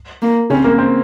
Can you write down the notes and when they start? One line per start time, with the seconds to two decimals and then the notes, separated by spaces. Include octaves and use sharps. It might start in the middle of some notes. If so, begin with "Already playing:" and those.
0.22 A#3
0.50 C#3 C4 C#4
0.64 A#3
0.78 C4